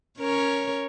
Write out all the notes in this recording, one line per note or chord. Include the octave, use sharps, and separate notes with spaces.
C#4 A#4 C#5